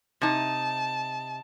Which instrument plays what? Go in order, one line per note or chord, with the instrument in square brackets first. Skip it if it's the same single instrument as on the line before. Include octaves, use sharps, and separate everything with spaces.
[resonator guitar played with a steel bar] C3 D#4 [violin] A5